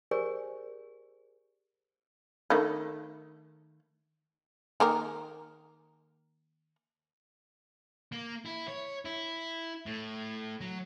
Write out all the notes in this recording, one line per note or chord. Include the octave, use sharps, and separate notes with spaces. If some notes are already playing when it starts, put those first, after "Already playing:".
G4 G#4 A#4 C5 D5 G#5
D#3 A3
D#3 A#3 A#4
A#3
E4
C#5
E4
A2
F#3